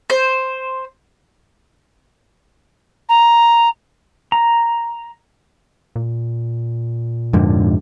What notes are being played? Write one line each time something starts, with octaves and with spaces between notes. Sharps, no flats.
C5
A#5
A#5
A#2
F2 G#2 D3